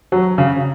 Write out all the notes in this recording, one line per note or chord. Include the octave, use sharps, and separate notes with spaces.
F#3
C#3